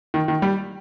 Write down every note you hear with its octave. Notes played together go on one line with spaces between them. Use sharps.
D#3
D#3
G3